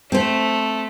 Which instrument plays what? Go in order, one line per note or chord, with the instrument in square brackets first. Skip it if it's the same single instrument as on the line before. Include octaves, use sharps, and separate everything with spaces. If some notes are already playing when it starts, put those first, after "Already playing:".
[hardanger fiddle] A3 [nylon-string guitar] C4 C5